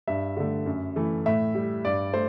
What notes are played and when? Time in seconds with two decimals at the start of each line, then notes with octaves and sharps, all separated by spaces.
0.08 G2 E5
0.37 D3 A3
0.66 F#2
0.96 E3 A3
1.26 A2 E5
1.55 G3
1.85 G2 D5
2.13 A3 C5